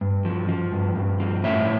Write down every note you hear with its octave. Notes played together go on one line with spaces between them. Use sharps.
G2
F3
F3
G2
G2
F3
A2 C#5 E5